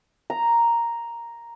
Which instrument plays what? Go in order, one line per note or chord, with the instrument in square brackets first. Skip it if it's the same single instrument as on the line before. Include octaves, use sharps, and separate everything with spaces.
[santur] A#5